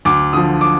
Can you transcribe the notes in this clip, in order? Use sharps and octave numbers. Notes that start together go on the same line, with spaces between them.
D2 D6
D3 F3 D#6
D6